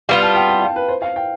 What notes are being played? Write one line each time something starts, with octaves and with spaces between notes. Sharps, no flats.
G3 B3 F4 F5
A5
G5
G5
F5
B4
C5
F5
G5